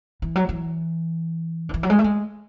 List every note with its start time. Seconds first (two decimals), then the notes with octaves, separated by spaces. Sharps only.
0.22 E3
0.36 F#3
0.49 E3
1.69 D3
1.74 E3
1.83 F#3
1.90 G#3
1.99 A3
2.04 G#3